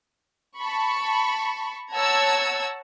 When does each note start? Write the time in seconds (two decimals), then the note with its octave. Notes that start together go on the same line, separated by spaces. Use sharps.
0.58 A5 B5 C#6
1.93 C#5 F#5 A5 A#5 E6 G#6